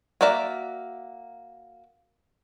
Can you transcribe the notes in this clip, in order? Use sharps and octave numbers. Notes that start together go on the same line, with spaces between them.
A#3 F#4 A#4 D5 E5